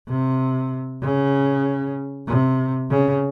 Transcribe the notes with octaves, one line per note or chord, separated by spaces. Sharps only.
C3
C#3
C3
C#3